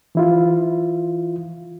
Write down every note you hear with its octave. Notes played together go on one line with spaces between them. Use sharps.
E3 E4 F4